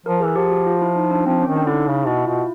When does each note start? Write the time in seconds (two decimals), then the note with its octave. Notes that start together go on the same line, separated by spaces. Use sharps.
0.06 F3 A#4
0.20 G#4
0.24 E3
0.36 F3 G4
0.50 F#4
0.67 F4
0.82 E4
0.96 D#4
1.11 D4
1.26 F3 C4
1.42 C#4
1.47 D#3
1.56 D4
1.67 D3 E4
1.71 D#4
1.87 C#3
2.07 B2 E4
2.18 E4
2.27 B2 F4